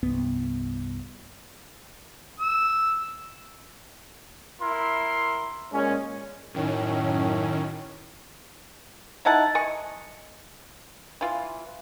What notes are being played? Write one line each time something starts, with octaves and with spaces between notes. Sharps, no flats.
C2 G2 B3
E6
E4 A#4 C6
A#2 G#3 C#4
F#2 A2 D#3 C#4
D#4 E4 F#5 A5
D#5 G#5 C#6
E3 F4